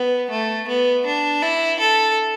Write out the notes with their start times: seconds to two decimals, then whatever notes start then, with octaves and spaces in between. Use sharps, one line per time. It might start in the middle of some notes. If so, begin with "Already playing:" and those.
Already playing: B3
0.30 A3
0.67 B3
1.05 D4
1.42 E4
1.79 A4